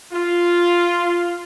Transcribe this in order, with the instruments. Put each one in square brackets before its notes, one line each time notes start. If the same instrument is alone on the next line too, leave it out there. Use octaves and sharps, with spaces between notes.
[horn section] F4